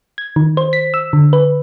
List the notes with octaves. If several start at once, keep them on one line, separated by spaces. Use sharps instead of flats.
G#6
D#3
C5
B6
E6
D3
B4